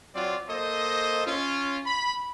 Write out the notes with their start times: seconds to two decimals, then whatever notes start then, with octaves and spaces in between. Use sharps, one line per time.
0.14 F#3 C4 F4 D5
0.48 A#3 A4 C5 D#5
1.25 C#4 F4
1.85 B5